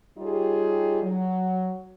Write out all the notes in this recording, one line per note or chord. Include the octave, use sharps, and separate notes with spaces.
G3 D#4 F4 G4 G#4 C#5
F#3